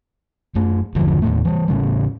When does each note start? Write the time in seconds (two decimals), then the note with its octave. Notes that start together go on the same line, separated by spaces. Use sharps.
0.55 F#2 A3
0.95 G1 E2 D3 F3
1.22 D#2 A2 A3
1.45 E3 G3
1.68 A2 C#3 G3